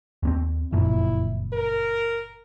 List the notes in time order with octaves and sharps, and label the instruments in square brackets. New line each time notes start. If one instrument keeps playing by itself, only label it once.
[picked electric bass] D#2 B3 C4
[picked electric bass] F#1 F2 A#2 [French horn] E4
[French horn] A#4